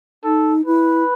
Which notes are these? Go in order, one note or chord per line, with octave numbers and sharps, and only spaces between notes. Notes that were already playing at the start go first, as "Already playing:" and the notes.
D#4 A4
E4 B4